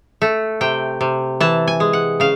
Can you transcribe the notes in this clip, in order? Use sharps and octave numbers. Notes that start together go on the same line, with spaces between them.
A3
C3 G5
C3
E3 A5
G#5
G#3
F#5
C#3 F5